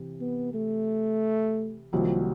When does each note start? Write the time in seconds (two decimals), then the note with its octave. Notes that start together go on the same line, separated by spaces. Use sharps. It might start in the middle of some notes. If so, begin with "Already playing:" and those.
Already playing: C3 E3
0.20 B3
0.54 A3
1.93 C2 C3 D#3 F3 F#3 A#3